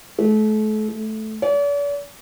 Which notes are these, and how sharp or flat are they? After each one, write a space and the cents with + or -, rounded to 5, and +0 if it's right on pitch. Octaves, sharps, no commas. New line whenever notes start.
A3 -35
A3 -10
D5 -45